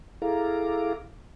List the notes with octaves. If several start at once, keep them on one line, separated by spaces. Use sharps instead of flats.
E4 G#4 A4 F5 A#5 D6